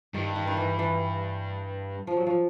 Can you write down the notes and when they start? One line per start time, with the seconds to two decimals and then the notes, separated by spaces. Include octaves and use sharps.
0.14 G2 D#3
0.36 D#3
0.47 D#3
0.57 E3
0.79 E3
2.07 F3
2.17 F#3
2.26 F3